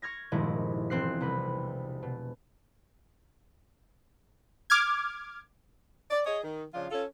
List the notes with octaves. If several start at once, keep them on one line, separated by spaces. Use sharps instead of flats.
C#6 F6 G#6 A#6
F1 G2 A#2 D#3 G#3 E4
E1 C4 F#6 C7
C2 C3 B4 B5
B2
D6 F6 G#6
D5
G#4 C#5 D#5
D#3
C#3 F3 D4 F4
C#4 F4 A4